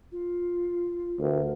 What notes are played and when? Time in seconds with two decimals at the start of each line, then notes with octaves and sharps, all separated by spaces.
0.12 F4
1.20 D2 A#4